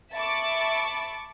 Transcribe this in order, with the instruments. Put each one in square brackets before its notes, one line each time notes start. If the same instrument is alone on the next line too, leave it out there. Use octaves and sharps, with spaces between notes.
[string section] E5 A5 B5 C#6 D6